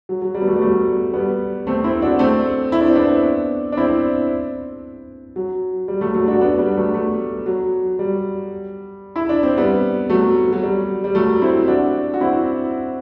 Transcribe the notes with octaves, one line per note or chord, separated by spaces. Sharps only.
F#3
F#3
G3
B3
F#3 A3
G3
F#3 A3
G3 B3
A3 C4
C4 E4
D4 F#4
A3 C4
E4
D4
C4
B3 D4
D4
C4 E4
F#3
G3
F#3 A3
F#3 A3
D4 F#4
B3 D4
G3 B3
F#3 A3
F#3 A3
F#3
G3
E4
D4
C4
G3 B3
F#3 A3
F#3
G3
G3
F#3 A3
C4 E4
D4 F#4
F#4
C4 E4